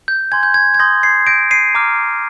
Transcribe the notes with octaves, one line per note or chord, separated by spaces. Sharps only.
G6
G#5 C6 G6 G#6
G6
G#6
G#6
C6 D#6 G6 A#6
G#6 C7
C6 G6 A#6 D7
C7 D#7
A#5 D6 F6